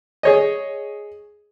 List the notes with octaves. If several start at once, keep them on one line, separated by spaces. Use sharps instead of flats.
G#4 C#5 D#5